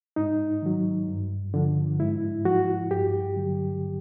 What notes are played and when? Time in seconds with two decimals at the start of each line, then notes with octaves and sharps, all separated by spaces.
0.16 G#2 D#4
0.62 D#3 F#3
1.08 G2
1.54 D3 F3
1.99 G#2 E4
2.45 F3 F#4
2.90 G2 G4
3.36 D3 F#3